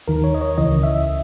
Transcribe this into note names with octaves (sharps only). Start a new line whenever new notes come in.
D#2 D#3 A#4
C#5
D#5
C#5
C#2 C#3 E3 D#5
E5